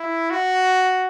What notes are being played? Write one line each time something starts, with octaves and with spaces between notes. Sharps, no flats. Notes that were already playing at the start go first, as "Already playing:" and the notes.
Already playing: E4
F#4